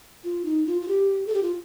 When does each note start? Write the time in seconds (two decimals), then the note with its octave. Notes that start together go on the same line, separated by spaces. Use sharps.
0.24 F4
0.45 D#4
0.67 F4
0.82 F4
0.88 G4
1.27 A4
1.34 G4
1.43 F4